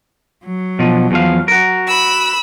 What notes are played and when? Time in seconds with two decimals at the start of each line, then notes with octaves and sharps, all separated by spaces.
0.46 F#3
0.79 B2 F3
1.11 E2 F3 F5
1.48 F#4 A#4
1.87 B5 E6